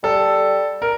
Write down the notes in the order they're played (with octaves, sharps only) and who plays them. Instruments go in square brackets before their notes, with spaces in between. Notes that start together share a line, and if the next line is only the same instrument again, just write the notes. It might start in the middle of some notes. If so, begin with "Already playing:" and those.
[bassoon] G3 [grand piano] A4
[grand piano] A#4